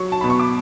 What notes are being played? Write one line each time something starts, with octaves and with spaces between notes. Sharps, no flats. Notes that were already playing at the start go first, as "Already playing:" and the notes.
Already playing: F#3 C#6
A5
B2 B5
C#6
D6